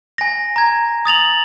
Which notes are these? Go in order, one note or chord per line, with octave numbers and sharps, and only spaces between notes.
G#5 A#6
A#5 G#6
D#6 A6 F7 F#7